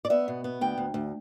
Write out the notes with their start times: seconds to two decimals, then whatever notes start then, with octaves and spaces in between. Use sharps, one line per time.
0.05 D5
0.10 B3 E5
0.28 B2
0.44 B3
0.61 D2 G5
0.78 D2
0.94 D2